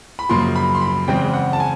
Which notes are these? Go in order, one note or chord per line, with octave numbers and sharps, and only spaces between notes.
B5
F#2 C#3 F3 A#3 C6
B5
C6
B5
E2 C#3 E3 G#3 C4 G5
F#5
A5
G#5